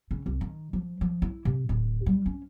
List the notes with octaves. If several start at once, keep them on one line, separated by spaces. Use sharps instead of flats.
C#3
C2
D#3
F3
F3
E4
C3
D1
G3
C#4